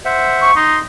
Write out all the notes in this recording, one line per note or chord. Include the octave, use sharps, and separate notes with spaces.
C5 E5 F#5
C#6
D#4 C6